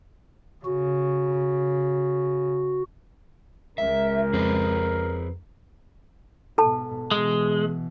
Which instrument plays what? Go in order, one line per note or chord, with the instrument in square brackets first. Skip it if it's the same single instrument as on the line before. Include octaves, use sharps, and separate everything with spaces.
[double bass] C#3 [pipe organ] F#4
[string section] C#2 [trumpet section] A#4 [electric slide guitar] E5
[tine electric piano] F2 [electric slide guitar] G#4 B4 C5
[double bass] G#2 B2 [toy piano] A4 A5
[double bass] B2 E3 [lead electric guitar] G#3